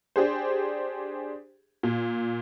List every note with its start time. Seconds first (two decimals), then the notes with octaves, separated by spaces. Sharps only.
0.16 D4 G4 G#4 C5
1.83 A#2